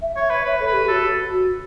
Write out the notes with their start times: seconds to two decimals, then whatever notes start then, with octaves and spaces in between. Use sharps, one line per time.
0.02 E5
0.16 C#5
0.30 B4 E5
0.45 B4 C#5
0.60 A4
0.67 B4
0.73 G4
0.88 F#4 A4